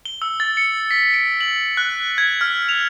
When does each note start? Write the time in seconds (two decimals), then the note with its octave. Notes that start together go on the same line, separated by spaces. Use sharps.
0.05 G7
0.22 E6
0.40 A6
0.57 C#7
0.91 B6
1.14 D7
1.41 F#7
1.77 F#6
2.18 G#6
2.41 F6
2.69 F7